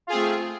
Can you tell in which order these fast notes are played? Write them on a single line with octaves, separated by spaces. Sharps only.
F4 G#4 C4 A3